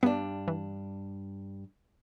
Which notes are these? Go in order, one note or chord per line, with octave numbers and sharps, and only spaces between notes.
G2 B3 D4 B4
E3